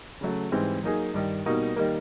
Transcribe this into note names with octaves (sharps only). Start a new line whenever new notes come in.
C#3 F#3 A3
G#2 E3 G3 C4
F#3 A#3 D#4 G#4
G2 D#3 G3
B2 G3 A#3 D#4 F#4
D#3 G3 A#3